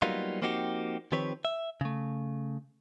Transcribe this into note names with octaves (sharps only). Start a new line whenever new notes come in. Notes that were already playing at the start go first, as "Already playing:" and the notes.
F#3 G3 A#3 B3 D#4 F4
F3 A#3 C4 D#4 F#4 G4
D#3 F3 C4 G4 B4 C#5
E5
C#3 A3